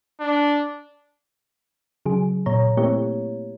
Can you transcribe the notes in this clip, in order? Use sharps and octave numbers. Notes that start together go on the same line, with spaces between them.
D4
C#3 F#3 G#4
A#2 C#5 A#5
A3 A#3 C4 E4 G4 C#5